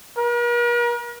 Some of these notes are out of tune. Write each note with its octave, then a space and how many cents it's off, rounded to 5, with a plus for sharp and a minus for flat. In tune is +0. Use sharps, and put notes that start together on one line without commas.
A#4 +45